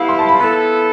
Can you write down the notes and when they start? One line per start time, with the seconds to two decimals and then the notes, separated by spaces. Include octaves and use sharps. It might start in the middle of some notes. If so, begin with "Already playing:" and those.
Already playing: G3 B3 E4 F5
0.09 C6
0.19 A5
0.29 B5
0.39 B3 E4 A4 B5